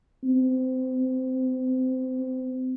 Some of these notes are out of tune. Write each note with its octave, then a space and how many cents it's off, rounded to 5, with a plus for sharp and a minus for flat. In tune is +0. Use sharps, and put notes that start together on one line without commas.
C4 -25